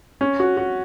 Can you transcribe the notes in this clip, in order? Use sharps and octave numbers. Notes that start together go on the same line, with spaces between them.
C#4
F#4
F#4